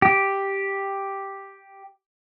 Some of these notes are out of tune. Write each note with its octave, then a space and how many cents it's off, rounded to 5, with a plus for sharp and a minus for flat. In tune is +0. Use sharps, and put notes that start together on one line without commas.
G4 +0